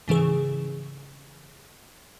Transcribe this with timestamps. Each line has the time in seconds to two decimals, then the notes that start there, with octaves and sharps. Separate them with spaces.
0.08 G#2 C#3 E3 G#4